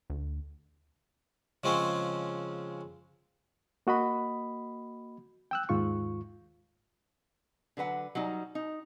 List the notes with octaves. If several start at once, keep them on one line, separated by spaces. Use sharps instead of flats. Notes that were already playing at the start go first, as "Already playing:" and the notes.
D2
C#3 F3 G#3 C4 C#4
A#3 F#4 D#5 B5
G5 E6 F#6
D#2 G#2 F4 C#6
D3 F#3 B4 F#5
F#3 G3 D#4
D#4